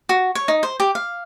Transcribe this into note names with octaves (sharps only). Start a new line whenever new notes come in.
F#4
C#5
D#4
C5
G4
F5